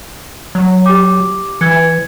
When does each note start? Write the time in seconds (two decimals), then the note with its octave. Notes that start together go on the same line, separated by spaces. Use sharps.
0.55 F#3
0.86 G4 D6
1.61 E3 G#6 C#7